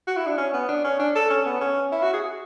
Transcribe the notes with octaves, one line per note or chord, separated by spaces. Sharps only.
F#4
E4
D4
C#4
B3
D4
C#4
D4
A4
C#4
B3
C#4
E4
F#4
G#4